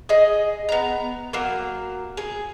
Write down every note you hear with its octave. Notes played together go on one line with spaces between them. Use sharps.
G#4 D#5
B3 A#5
F#3 A#3
G#4